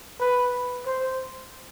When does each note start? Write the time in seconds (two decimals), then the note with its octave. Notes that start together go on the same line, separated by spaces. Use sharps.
0.20 B4
0.86 C5